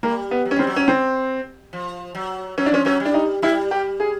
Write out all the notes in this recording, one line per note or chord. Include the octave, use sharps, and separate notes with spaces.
G3 A#3
B3
F#3
C#4
G3 C4
F#3
C#4
C4
F3
F#3
F#3 C#4
D4
F3 C#4
F#3 C#4
G3
D4
D#4
G3 E4
G4
G#4